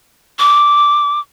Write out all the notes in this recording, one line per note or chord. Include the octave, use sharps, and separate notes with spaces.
D6